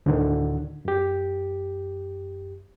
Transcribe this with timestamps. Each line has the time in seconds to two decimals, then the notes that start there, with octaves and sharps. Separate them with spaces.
0.06 D2 A2 D3 D#3
0.85 F#2 G4